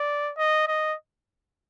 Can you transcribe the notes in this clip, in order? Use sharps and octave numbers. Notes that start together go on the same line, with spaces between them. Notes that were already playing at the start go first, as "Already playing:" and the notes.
Already playing: D5
D#5
D#5